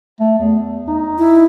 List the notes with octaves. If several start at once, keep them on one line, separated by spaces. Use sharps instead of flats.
A3
E2
D#4
E4